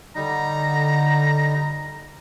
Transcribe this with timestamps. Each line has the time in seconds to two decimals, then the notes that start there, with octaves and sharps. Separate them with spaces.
0.16 D3 G3 D#4 A#5